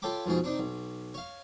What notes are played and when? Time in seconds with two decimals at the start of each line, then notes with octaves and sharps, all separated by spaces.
0.02 F4 A4 C#5 G5 B5 D6
0.26 F2 G#2 B2 G#4
0.44 C4 D4 D#4
0.59 B1
1.14 C#5 F5